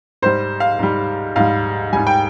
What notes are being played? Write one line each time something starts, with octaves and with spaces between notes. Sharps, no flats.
G#2 G3 C5
F5
G#2 G3
G#2 G3 F5
G#2 G3 G#5
G5